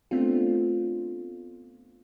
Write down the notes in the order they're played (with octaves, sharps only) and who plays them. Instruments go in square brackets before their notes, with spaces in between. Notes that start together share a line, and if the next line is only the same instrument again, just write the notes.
[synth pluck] A3 B3 C4 D4 F4